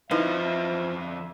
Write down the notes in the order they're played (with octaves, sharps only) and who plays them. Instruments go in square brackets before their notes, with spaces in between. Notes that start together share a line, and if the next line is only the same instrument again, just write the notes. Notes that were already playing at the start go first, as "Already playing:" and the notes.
[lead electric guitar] F2 D#5 [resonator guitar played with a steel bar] F3 [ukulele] D#4 E4 B4 [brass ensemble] E5
[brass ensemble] D3 E5